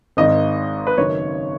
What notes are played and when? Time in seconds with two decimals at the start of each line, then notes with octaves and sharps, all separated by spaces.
0.17 G#1 G#2 D#3 D#5
0.87 B4
0.97 F#1 F#2 D#3 C#5